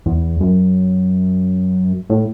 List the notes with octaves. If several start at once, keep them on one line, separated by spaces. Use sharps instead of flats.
E2
F#2
A2